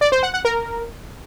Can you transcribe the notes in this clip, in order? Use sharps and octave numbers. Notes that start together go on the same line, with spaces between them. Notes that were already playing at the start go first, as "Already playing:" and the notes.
D5
C5
F#5
F#5
A#4